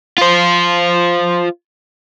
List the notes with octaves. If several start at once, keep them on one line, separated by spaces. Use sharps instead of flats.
F4 C5